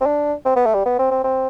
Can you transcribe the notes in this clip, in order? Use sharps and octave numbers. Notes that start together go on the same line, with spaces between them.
C4
D4
C4
B3
A3
G3
B3
C4
C4
C4